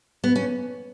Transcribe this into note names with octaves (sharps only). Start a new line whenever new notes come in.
B3
C#4